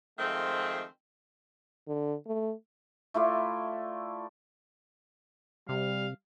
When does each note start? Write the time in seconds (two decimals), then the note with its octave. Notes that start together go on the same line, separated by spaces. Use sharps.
0.19 D#3 F3 G#3 A3 C4
1.88 D3
2.26 A3
3.14 A3 E4 F4 D5
5.69 C3 G3 F5